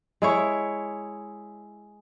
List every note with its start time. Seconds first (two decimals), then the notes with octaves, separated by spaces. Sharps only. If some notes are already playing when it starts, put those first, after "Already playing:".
0.22 G#3 E4 C#5